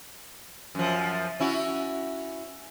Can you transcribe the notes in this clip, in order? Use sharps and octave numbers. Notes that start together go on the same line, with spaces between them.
F#2 F3
C#4 E4 F#4